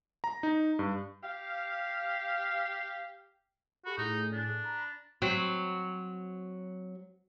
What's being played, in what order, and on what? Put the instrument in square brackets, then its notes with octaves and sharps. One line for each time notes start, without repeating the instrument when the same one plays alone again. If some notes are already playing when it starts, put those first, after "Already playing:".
[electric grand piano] A#5
D#4
G2
[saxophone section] G4 F5
[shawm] F#4 [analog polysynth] G4 A4 B5
[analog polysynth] A2 G#4 [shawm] D#4
[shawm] D4
[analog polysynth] A#5 B5
[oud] F#3 C4